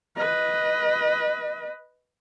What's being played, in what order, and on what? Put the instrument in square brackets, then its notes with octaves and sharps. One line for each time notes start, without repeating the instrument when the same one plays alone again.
[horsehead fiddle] B4 D#5